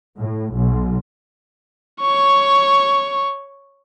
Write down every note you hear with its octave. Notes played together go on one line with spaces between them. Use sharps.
A2
B1
C#5 C#6